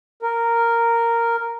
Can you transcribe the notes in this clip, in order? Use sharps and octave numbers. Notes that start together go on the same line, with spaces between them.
A#4